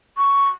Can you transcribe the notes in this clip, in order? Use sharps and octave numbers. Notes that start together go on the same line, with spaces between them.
C#6